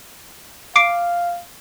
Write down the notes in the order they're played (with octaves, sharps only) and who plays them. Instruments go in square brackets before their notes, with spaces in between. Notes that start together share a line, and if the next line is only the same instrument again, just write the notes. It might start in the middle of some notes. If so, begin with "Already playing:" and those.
[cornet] F5 [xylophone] D6 C7 D7